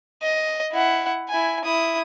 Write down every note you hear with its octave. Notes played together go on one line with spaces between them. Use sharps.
D#5
E4 F#5
E4 G#5
E4 D#6